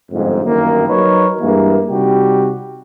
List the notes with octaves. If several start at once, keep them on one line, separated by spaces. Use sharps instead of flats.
G1 F2 G#2
G1 F#2 D#3 A#3
F#3 D#4 A#4 B4 C#5
G2 E3 G#3 A#3
C3 G3 D#4 F#4 G4